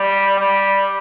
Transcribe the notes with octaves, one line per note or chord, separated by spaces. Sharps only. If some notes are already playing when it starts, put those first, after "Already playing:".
Already playing: G3
G3